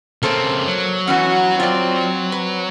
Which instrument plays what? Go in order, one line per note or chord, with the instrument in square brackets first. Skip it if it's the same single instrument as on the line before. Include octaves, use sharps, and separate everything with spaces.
[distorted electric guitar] C#3 C4 [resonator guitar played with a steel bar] A#3 A4 C5
[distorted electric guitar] F#3
[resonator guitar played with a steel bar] E3 B3 C#4 [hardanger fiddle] F#4 F#5
[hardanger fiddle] C4 [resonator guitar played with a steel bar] F4 D5
[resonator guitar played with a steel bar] B4